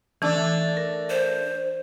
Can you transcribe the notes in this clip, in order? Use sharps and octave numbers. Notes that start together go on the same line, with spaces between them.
E3 A3 D4 E6
A#4
C5